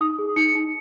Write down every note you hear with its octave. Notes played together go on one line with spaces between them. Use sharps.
D#4 D#6
G#4
D#4 C#7
D#4